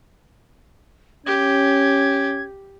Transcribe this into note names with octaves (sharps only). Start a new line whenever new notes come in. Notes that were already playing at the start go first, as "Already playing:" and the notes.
C#4 G4 G#6